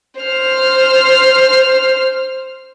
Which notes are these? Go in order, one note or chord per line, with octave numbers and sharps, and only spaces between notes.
C5 F6